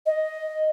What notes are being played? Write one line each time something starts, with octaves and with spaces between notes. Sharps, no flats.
D#5